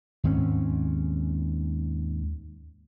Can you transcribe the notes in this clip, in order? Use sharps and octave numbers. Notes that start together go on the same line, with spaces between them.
D#2 G#2 C4 C#4